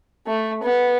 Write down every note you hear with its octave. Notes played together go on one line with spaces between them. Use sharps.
A3
B3